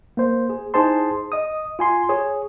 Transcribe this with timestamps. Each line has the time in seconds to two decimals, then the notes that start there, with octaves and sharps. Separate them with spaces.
0.17 A#3 C5
0.50 G#4
0.74 D#4 E4 G#4 C5 A5 C6
1.32 D#5 D#6
1.79 F4 G#5 C6
2.09 G#4 C#5